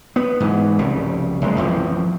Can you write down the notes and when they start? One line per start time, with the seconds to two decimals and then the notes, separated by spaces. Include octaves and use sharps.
0.16 B3
0.40 G#2 E3
0.79 F1 C2 C#3 G3
1.42 F#1 C#3 G#3
1.57 A1 F2 E3 F3